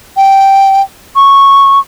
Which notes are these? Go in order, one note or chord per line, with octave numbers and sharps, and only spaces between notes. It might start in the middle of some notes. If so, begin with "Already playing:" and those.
G5
C#6